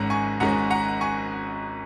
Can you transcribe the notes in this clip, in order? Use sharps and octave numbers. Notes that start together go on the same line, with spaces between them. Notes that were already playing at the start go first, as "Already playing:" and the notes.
Already playing: G#1 G#2 G#3 C#4 F#5 A#5
G#5 C#6
G#1 G#2 G#3 C#4 F#5 A#5
F#5 A#5
G#5 C#6